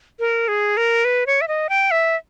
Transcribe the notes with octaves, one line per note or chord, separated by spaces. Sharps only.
A#4
G#4
A#4
B4
C#5
E5
D#5
G5
E5